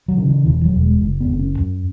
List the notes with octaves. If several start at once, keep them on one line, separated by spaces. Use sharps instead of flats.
F#3
C#3
E3
E1 E3
F#3
E1
G#3
F#1
B3
F#1
C#4
F#2